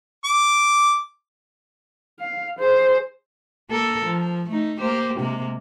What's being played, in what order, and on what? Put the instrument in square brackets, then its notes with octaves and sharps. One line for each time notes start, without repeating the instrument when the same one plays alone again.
[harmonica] D6
[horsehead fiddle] F5
G#4 C5
[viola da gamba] A#3 A4 A#4
F3
A3 D#4
A#3 G4 C5
C3 G#3 A#3